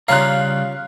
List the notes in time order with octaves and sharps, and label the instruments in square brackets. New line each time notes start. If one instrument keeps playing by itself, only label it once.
[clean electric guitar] C#3 G3 A#5 [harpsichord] F4 C#5 [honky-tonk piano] F5 F6 F#6